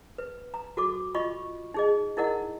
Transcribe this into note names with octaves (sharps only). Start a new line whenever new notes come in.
B4
A#5
F#4 A4 D6
F4 D#5 B5 C#6
D#4 G#4 D#5
D#4 E4 A#4 D#5 F#5